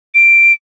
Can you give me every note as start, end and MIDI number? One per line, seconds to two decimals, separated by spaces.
0.15 0.53 98